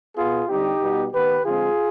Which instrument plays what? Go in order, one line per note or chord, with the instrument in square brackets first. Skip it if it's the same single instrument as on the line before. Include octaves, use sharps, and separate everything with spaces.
[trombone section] B2 B3 F4 G#4
D3 G3 C4 D#4 G4
B2 G3 B3
D#3 B3 G4 B4
D3 F3 G#3 C4 F4 G#4